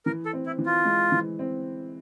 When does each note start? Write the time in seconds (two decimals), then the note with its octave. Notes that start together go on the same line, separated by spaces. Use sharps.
0.06 E3 A#4
0.25 A4
0.33 C4
0.46 E4
0.59 E3
0.66 F4
0.85 G#3
1.12 E3
1.39 C4